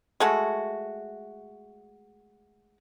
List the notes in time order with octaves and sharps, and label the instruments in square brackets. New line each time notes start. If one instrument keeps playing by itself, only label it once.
[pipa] G#3 A3 F#4